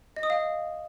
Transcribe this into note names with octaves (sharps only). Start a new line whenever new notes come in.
D#5
D#6
F5